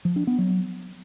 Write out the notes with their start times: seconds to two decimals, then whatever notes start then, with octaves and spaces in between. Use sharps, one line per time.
0.05 F3
0.16 D4
0.27 B3
0.38 F#3